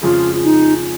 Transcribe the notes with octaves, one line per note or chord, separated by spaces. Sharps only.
F2 C#3 F3 G#3 F4
D#4